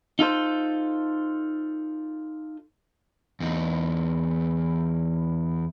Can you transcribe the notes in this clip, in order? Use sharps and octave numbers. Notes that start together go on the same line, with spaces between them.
D#4 F4 A4 C5
E2 D#4